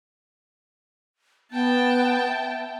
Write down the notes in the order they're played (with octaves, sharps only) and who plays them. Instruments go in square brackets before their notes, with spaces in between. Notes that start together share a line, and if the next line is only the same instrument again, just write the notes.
[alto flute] B3 [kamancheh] G5 A5
[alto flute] E5